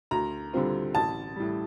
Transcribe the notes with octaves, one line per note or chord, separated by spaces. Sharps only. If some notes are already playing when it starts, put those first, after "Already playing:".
D2 A#5
D3 G3 C4 F4
A1 A5
A2 G3